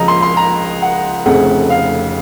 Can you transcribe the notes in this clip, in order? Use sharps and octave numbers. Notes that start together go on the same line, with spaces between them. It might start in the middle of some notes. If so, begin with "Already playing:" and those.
Already playing: C#2 C#3 F3 D#5 A#5
C6
C6
A#5
F#5
F1 F2 C#3 A3 F#5
F5